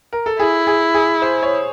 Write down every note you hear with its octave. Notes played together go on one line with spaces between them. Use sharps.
A#4
A4
E4 G#4
G#4
G#4
C5
C#5